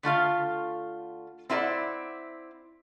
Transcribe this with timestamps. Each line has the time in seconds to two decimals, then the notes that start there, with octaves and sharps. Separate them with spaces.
0.03 D3 A3 F4 F5
1.50 C4 E4 F4 B4 D5 F#5